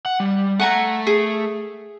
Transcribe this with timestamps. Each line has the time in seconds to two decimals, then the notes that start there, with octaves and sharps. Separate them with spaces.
0.06 F#5
0.20 G3
0.60 A3 F#5 G#5 A#5
1.07 G#4